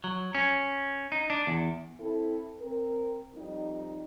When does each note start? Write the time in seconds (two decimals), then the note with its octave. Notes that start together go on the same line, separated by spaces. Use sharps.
0.04 F#3
0.35 C#4
1.12 D#4
1.30 D4
1.47 E2
2.00 C4 E4 A4
2.60 C4 A#4
3.36 F2 G3 D#4